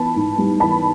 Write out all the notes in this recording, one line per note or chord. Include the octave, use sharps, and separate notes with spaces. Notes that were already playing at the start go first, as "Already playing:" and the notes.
Already playing: E3 B3 A5 B5
G#2
G3
E3 A5 B5